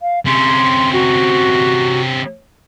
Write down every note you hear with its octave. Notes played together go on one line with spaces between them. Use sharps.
F5
C3 C#4 C6
F#4